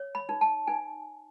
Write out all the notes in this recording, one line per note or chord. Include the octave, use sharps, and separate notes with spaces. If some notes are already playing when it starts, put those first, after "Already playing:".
Already playing: C#5
B5
D#4
A5
D#4 G#5